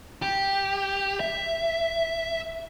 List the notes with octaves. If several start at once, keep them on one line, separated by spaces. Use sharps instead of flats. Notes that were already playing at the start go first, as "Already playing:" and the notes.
G4
E5